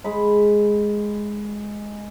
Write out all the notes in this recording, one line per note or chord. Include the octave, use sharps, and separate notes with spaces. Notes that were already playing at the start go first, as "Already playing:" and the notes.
G#3 B5